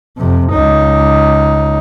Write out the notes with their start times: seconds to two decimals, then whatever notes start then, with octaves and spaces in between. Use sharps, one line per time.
0.17 F2 C3
0.52 C#2 D#4